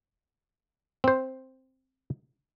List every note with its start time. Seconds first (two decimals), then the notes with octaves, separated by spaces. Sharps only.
1.04 C4 C5